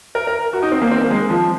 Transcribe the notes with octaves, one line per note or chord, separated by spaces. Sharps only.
A#4
A#4
F#4
D#4
C4
A#3
C4
A#3
G#3
F3